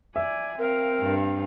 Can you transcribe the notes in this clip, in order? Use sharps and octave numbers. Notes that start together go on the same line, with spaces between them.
D5 E5 G#5
C4 A#4 F5
G2